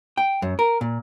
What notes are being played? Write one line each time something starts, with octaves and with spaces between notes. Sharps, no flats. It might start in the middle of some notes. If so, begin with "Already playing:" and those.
G5
F#2
A#4
A#2